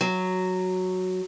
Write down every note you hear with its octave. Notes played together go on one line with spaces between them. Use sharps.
F#3